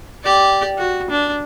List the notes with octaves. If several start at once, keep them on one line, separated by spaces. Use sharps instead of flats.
G4 D5
F#4
D4